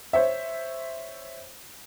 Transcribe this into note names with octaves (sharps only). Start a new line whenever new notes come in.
C5 C#5 E5